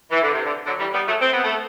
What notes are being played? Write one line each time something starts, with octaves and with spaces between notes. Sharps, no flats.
E3
D3
C3
D3
D3 F#3
E3 G3
G3 B3
F#3 A3
C4
B3
A3